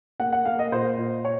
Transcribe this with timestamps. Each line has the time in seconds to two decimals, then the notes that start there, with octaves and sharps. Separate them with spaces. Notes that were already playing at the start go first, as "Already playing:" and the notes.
0.20 A#3 F#5
0.33 F#5
0.45 A#3 F5
0.59 D#5
0.72 A#2 C5
0.98 A#2
1.25 C#5